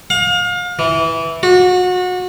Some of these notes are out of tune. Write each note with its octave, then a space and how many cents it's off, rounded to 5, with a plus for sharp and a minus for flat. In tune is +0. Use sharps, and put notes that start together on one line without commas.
F5 +35
E3 -10
F#4 -30